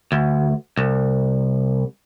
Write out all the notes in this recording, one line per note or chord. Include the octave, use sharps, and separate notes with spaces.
D2
C2